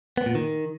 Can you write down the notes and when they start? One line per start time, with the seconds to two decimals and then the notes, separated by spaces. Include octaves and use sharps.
0.18 B3
0.26 A#2
0.35 D#3